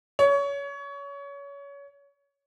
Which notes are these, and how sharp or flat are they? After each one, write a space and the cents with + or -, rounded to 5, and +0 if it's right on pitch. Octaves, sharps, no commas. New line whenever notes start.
C#5 +25